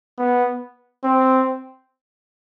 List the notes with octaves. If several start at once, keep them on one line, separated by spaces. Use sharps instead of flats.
B3
C4